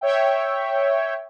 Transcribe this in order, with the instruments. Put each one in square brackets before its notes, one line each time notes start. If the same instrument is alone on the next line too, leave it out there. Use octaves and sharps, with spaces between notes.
[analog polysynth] C#5 E5 G5